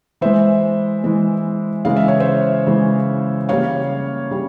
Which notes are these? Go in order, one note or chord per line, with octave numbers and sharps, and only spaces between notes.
E3 G#3 C5 E5
E3 G#3
C#3 E3 G#3 F5
E5
C#5
C5 E5
C#3 E3 G#3
C#3 G3 A#3 C#5 F5
C#3 G3